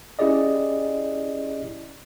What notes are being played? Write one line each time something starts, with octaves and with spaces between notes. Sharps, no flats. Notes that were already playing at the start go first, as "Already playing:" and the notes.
C#4 E4 G4 G#4 D5 D#5